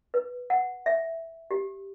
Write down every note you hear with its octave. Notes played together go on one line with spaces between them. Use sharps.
B4
F#5
E5
G4